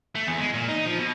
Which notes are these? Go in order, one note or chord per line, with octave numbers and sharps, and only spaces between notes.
A3
E2
G#3
A#2
D#4
F3
B2